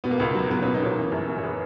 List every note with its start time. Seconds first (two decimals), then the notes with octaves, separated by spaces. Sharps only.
0.04 B2 B3
0.11 A#3
0.18 C#2 B3
0.35 F#3
0.50 C#2 B3
0.62 A#3 C#4
0.66 B2
0.74 B3 D#4
0.82 C#2 A#3 C#4
0.98 E3
1.12 F#2
1.28 A#3
1.38 C#5
1.43 G#4 B4